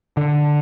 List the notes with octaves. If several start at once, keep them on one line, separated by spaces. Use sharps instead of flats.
D3